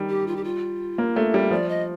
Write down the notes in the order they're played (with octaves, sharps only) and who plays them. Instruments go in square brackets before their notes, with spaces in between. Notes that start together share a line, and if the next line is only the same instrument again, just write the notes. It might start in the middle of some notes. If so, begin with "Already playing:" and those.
Already playing: [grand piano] D#3 G3
[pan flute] G4
F4
G4
F4
[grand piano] A#3
A3
G3
[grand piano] F3 [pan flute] D5
[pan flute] D#5